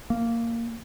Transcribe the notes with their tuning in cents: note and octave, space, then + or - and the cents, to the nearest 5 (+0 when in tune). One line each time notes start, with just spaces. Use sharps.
A#3 -10